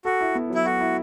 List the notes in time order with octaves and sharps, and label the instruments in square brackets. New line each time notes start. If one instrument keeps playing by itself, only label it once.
[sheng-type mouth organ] F#4 [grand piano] A4
[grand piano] E4
B3
[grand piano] F#3 [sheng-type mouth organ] E4
[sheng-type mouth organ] F#4 [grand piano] A4
[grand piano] E4